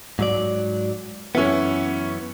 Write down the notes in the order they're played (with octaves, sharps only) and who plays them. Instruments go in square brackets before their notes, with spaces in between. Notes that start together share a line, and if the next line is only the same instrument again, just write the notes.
[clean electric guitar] G#2 F#3 D5
[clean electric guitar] F#2 E3 B3 [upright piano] C#4 E4